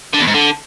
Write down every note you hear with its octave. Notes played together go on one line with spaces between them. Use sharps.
D3
E2
G#2
D3